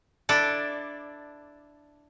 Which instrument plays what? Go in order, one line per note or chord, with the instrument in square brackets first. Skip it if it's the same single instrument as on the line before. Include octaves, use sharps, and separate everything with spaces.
[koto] D4 E4 A4 D5